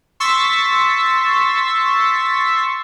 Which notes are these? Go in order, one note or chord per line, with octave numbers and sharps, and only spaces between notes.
C6 C#6 E6 A6 B6